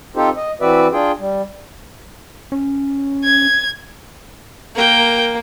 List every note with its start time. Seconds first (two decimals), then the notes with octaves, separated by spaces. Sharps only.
0.16 C4 D#4 F4 G4 A4 C5
0.37 D#5
0.61 E3 C4 F#4 B4 D5 E5
0.93 D4 F4 G#4 G5
1.19 G3
2.52 C#4
3.25 G#6
4.75 A#3 A#4 G5